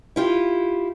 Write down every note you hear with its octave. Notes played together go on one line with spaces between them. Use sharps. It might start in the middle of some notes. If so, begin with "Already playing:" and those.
E4 F4 G4